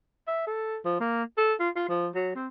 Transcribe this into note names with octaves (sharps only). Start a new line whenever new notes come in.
E5
A4
F3
A#3
A4
F4
F4
F3
F#3
C4